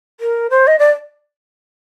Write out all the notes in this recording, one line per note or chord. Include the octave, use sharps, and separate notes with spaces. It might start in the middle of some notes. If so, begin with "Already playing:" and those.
A#4
C5
D#5
D5